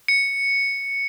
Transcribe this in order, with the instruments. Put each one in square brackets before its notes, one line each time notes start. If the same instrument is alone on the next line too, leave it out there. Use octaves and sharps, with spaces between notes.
[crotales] C#7